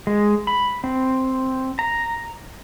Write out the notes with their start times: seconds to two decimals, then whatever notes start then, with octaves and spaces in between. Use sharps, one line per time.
0.07 G#3
0.47 B5
0.84 C4
1.79 A#5